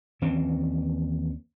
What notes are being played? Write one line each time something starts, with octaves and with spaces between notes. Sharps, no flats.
D#2 E3 C4 C#4